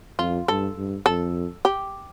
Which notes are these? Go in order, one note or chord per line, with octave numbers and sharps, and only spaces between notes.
F2 F4
G2 A4
G2
F2 A4
G4